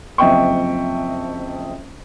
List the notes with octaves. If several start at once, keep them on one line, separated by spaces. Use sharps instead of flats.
F#1 F2 D#5 E5 G5 C#6